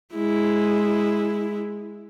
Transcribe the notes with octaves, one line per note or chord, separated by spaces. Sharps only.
G#3 E4